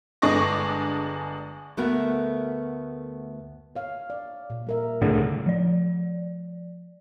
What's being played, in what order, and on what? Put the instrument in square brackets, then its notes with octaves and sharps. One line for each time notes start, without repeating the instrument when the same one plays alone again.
[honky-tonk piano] G1 G#3 D4 C#6 D6 A#6
[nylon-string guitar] D2 A3 B3 F#4 A#4 E5
[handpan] C#5 F5
D5
A#2
G3 A#4 E5
[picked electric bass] C#2 A2 D3 [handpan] D#3 G3 G#4
[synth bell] F3 D5